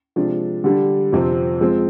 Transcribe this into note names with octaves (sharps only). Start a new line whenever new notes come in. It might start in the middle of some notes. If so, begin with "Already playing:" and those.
C3 F3 G#3 D4
D3 G3 D4
F2 C3 F3 C4
F3 G#3 C4